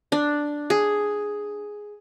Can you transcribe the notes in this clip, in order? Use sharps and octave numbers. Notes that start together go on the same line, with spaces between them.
D4
G#4